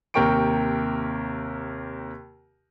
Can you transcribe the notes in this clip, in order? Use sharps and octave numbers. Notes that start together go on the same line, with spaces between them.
D#2 C3 A#4 G5 C#6 D7